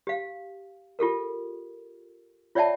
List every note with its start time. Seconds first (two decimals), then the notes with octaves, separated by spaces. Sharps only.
0.07 G4 F5
0.99 F4 G4 A4 A#4
2.55 F4 C#5 D5 E5 G5 A5